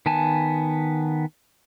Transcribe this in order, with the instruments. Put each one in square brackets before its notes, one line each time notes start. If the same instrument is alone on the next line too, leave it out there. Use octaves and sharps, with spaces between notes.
[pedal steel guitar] D#3 B3 G#5 A5